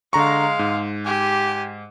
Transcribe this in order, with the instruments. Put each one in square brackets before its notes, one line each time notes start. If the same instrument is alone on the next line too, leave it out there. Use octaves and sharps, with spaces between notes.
[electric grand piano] D3 A#5 C#6 [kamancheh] G#3 F5
[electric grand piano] G#2
[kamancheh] G4 G#5